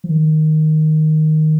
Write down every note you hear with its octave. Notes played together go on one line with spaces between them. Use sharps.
F3
D#3